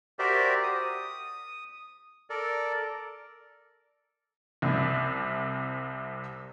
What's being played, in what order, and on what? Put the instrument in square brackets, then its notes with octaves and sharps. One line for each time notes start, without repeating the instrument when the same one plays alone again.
[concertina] F#4 G4 A#4 C5 D5 E5
D#6
A4 A#4 D5
[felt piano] C2 C3